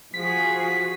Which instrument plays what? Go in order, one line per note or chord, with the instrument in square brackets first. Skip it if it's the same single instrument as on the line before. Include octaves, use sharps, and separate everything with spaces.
[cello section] F3 F#4 G#4 [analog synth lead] B6